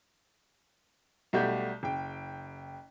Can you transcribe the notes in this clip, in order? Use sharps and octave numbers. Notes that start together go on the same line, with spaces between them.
B1 G3 A3 F#4 G4 G6
F#1 G5